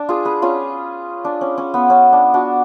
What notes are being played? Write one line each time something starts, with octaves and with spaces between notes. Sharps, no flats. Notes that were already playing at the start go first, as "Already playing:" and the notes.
Already playing: D4
F4 G#4
G#4 B4
C#4 F4
D4
C#4
C#4
B3
C#4
D4
D4 F#4